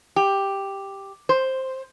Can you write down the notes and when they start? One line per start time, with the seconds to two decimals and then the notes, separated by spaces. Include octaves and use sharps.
0.16 G4
1.29 C5